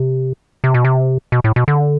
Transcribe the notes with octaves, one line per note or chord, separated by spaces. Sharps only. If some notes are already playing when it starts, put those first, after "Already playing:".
Already playing: C3
C3
B2
C3
B2
A2
B2
D3